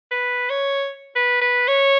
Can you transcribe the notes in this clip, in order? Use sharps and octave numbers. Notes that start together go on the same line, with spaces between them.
B4
C#5
B4
B4
C#5